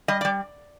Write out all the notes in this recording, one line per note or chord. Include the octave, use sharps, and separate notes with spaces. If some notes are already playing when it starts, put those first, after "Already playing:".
G3 D#5
D5
G3